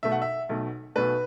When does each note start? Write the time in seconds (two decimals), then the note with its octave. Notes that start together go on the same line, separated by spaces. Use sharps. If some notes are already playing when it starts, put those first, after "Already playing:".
0.03 B1 B2 A3 E5
0.12 F#5
0.22 E5
0.49 B1 B2 A3
0.95 B1 B2 A3 B4